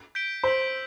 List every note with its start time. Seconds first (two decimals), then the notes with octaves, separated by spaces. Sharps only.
0.15 G6 B6 D7 G7
0.43 C5 E6 B6 F#7